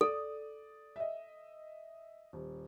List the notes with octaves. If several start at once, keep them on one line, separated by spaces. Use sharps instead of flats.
A4 D5 D#6
D#5 E5
D#1